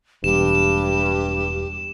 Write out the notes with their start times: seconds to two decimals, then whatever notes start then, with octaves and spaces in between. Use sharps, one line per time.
0.24 E1 G2 G4 E7